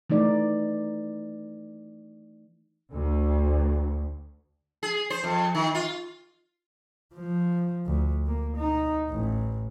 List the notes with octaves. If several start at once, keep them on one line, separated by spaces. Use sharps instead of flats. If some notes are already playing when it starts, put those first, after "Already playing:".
E3 A3 D#4 D5
D2
G#4
C5
F2
D#3
F4
F3
D2
A#3
D#4
A1